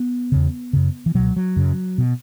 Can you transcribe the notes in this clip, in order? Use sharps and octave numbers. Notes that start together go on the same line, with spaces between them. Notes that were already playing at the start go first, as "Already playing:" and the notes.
Already playing: B3
E2 C#3
F#2 C#3
E3
C#2 B2 F#3
F#3
F#2 C#3
B2